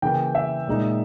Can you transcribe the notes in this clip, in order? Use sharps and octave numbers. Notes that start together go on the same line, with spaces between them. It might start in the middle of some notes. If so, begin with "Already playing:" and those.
C#3 E3 A#3 G5
E5
A#2 G#3 D#4